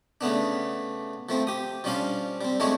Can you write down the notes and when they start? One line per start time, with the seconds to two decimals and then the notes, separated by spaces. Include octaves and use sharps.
0.21 C#3 A3 B3 D4
1.29 F3 A3 C4
1.47 G4 D#6
1.84 F3 G3 C#4 D4 F4 F5
2.41 G3 C4
2.60 F3 G#3 A3 C4 D4 C#5